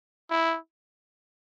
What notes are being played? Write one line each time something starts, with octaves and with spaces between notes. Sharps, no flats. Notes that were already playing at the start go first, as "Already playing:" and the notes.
E4